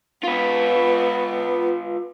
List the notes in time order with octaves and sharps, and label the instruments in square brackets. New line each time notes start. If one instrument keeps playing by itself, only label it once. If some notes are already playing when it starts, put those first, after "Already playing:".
[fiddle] B3 [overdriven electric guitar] F4 B4